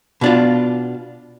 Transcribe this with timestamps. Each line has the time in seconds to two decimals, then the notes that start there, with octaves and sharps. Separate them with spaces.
0.21 B2 D4 F4